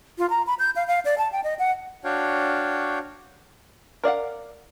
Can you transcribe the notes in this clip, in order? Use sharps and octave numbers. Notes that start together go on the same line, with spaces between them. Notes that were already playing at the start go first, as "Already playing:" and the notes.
F4
A#5
B5
G6
F5
F5
D5
A5
G5
D#5
F#5
D4 F#4 C#5 F5 G5
A#4 D5 F5 F#5